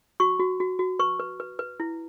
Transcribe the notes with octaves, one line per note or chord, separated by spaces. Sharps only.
F#4 C#6
F#4
F#4
F#4
B4 C#6
B4
B4
B4
E4